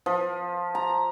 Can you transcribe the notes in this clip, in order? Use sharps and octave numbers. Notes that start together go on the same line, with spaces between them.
F3
A#5